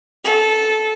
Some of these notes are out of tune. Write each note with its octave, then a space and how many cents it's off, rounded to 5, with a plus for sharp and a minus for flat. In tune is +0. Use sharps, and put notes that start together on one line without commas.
A4 -15